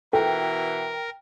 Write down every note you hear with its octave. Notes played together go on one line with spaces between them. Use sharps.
B2 E3 A4 A#4 G5